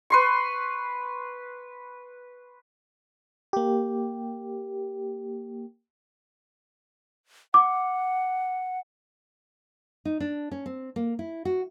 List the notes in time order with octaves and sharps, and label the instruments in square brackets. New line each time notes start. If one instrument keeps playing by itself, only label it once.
[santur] B4 C6 C#6
[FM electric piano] A#3 G4
[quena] F#5 [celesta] D6
[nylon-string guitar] D#4
D4
C#4
C4
A#3
E4
F#4